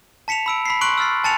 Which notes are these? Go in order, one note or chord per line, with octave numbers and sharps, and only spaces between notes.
A5 B6 C#7 E7 F7
B5 E6 D7
B5 B6 C7
C6 C#6 F#6 D7 F#7
E6 F6 A6 C7
G#5 A5 A6 C#7 F7